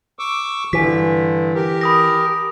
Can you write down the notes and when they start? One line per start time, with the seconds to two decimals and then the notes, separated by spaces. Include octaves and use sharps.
0.19 C#6 D6 E6
0.73 G2 D3 E3 G#5 B6
1.55 G4 A#4
1.81 B5 D#6 A#6